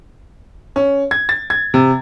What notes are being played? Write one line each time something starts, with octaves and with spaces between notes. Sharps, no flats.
C#4
G#6
A6
G#6
C3